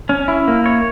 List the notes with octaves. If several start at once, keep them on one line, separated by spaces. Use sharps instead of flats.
C#4
E4
A#3
C#5